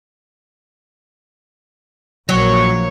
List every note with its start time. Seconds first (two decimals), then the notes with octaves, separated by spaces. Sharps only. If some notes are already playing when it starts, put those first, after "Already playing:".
2.29 A#1 F#3 A#3 C#5 C#6